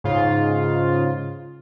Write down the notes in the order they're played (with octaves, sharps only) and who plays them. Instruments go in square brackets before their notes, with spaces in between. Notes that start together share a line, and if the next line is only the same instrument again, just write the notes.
[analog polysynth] G#2 C#3 F4